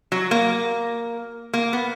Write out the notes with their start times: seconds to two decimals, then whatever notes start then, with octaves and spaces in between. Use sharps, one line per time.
0.12 F#3
0.31 A#3
1.54 A#3
1.73 B3